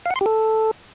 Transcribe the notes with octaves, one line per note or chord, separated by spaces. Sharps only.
F5
F#5
C6
G4
A4